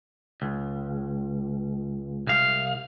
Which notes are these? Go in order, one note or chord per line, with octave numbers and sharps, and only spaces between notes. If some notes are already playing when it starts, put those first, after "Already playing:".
C#2
C2 F5